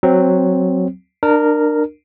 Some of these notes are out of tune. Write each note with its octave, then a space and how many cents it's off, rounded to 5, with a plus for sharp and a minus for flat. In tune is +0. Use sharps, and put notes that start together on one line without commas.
F#3 +0 C4 +0
D4 +30 A#4 -5